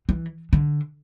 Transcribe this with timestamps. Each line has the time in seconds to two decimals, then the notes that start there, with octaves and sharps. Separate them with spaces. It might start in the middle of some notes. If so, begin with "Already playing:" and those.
0.09 E3
0.53 D3